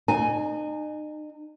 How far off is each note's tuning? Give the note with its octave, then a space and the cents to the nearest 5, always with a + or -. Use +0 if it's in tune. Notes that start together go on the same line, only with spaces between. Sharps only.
D#4 -35 G#5 +0